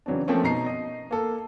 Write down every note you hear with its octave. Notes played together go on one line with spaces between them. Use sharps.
C#3 E3 F#3 C4 D4
F3 A3 A#3 C4 C#4
B2 D#4 A#5 C7
D#5
A#3 A4